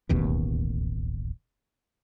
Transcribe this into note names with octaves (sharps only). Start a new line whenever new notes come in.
D1 A1 D#2 B2